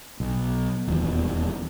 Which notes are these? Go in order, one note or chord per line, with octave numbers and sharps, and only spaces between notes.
B1
D#1 E2